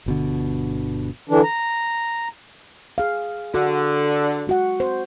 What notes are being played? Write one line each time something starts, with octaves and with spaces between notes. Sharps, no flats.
G1 B2 D3
D3 E3 D4
A#5
G#4 F5
D3 F#4
G#3 F#4 F#5
C5